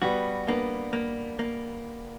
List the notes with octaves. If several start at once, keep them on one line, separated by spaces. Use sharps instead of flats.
G3 B3 F#4
A#3 B3 D4
A#3
A#3